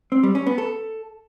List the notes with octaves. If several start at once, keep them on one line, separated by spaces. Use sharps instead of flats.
C4
G3
C#4
B3
A4